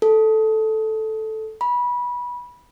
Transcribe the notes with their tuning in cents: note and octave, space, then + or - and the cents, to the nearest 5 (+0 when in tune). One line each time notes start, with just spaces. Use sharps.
A4 -5
B5 -20